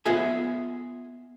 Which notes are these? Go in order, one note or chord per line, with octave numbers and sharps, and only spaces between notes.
B3 F4 G#4 D#5 E5 G#5